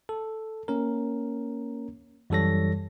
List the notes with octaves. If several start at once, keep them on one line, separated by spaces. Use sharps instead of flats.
A4
A#3 C#4 A#4
F#2 E3 G3 A4 C#5 A#6